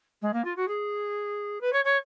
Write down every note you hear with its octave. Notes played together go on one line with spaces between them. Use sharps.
G#3
A#3
F4
F#4
G#4
B4
C#5
C#5